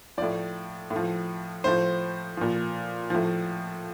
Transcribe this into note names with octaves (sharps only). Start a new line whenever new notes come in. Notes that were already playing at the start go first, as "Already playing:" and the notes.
A2 F3 D5
A2
F3
A2 F3 C5
A#2 F3
A2 F3